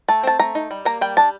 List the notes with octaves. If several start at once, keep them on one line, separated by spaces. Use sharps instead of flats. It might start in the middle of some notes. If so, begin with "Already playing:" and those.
A3 A5
C4 A5
A3 A#5
D#4
G3
A#3 A#5
G3 G5
D4 A5